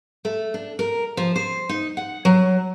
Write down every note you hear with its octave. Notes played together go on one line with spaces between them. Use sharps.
A3
D4
A#4
F3
C5
D#4
F#5
F#3